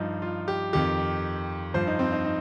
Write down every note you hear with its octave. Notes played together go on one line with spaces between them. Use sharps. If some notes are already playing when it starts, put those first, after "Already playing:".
Already playing: G2 F3 D#4
F4
G4
F2 D#3 G4
G2 F3 C5
D#4
C4
D#4
D#4